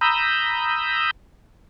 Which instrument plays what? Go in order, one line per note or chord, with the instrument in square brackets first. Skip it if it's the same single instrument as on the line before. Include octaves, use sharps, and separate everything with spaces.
[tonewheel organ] A#5 B5 D#6 E6 G6